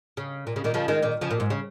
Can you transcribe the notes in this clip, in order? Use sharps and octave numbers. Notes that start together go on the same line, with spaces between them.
C#3
A#2
C#3
A#2 D#3
C#3 F3
D#3 G#3
A#2 D#3
C#3 F3
A#2
G#2
C#3